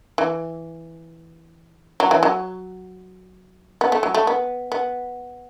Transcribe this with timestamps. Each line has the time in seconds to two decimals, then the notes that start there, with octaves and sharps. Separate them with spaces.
0.18 E3
2.00 F#3
2.11 E3
2.23 F#3
3.81 B3
3.92 A3
4.03 F#3
4.14 A3
4.27 B3
4.72 B3